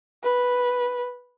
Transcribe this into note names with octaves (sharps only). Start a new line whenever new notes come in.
B4